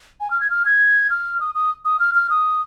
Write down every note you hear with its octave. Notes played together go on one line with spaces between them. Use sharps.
G#5
F6
G#6
F6
G#6
F6
D#6
D#6
D#6
F6
F6
D#6